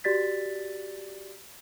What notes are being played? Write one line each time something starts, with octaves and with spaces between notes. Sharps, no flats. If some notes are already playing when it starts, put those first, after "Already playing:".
F#4 G4 D5 A6 B6